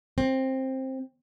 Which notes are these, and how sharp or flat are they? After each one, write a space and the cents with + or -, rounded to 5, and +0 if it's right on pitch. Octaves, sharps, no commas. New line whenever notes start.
C4 +15